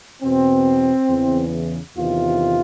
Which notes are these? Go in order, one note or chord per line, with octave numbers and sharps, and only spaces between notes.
E2 B2 C4
E2 C#3 E3
E2 C3 D#3 F4